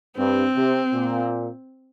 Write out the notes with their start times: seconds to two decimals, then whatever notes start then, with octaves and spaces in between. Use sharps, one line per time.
0.17 G2 C4
0.55 C3
0.93 A#2